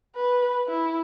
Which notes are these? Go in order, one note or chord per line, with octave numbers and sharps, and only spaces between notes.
B4
E4